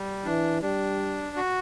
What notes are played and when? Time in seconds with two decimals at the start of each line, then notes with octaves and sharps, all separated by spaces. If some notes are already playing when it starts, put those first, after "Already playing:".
Already playing: G3
0.25 E3 D4
0.62 G3 D4
1.36 F#4